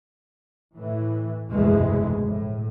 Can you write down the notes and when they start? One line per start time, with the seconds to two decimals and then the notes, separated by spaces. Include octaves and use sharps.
0.73 A2 E3
1.51 F1 D2 G2 B2 E3 G#3
2.27 A2